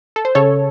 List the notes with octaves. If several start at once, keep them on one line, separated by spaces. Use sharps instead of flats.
A4
C5
C#3 A4 C#5